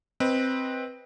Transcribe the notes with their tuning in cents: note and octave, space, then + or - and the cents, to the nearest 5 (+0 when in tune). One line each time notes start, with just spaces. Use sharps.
C4 +0 B4 -10 D#5 +0